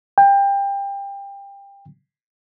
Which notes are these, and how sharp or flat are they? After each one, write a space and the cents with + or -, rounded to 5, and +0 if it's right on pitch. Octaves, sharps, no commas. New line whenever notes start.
G5 +25